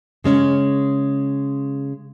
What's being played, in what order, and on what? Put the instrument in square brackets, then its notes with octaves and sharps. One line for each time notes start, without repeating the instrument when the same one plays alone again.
[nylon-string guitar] C#3 G#3 C#4